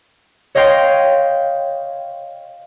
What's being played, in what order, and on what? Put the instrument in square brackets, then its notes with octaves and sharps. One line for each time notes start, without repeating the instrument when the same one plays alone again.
[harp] C#5 D#5 F5 G5 C6 C7